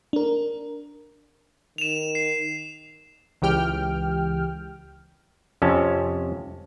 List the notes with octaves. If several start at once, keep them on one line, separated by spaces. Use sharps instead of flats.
D4 A#4
D#3 E7 F7
C7
C#2 E3 G4 G5 F6
F2 C3 C#4 A5